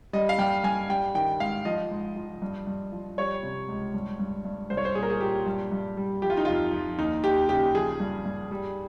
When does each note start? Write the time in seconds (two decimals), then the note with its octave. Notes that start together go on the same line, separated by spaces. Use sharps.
0.13 G3 D#5
0.29 F5
0.38 G2 G5
0.64 G2 G#5
0.89 G3 G5
1.15 D#3 G5
1.40 G#2 F5
1.65 F3 D#5
1.91 G#2
2.16 F3
2.42 G2
2.67 G2
2.92 F3
3.18 G3 C#5
3.43 C3
3.68 C#2
3.94 G2
4.20 G2
4.45 G2
4.70 C2 C5
4.77 C#5
4.85 C5
4.95 A#2 G#4
5.03 A#4
5.10 G#4
5.21 A#2 G4
5.46 G2
5.72 G2
5.97 G3
6.22 F3 G4
6.30 F4
6.37 D#4
6.45 F2 F4
6.73 F2
6.98 D#2 D#4
7.24 D#2 G4
7.49 C#3 G4
7.74 F3 G#4
8.00 G2
8.25 G2
8.51 G3